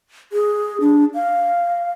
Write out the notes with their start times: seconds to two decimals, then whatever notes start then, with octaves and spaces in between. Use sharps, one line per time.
0.33 G#4
0.81 D4
1.15 F5